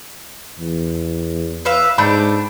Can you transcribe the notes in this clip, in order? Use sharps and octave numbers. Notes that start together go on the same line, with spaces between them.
E2
B4 E5 F5
G#2 A3 D4 G5 B5